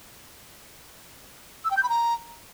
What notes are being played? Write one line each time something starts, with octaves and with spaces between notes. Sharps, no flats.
E6
G5
G6
B5
A#5